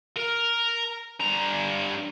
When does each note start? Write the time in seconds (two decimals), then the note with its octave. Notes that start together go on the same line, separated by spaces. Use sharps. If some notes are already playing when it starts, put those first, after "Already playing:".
0.17 A#4
1.20 G2 A#5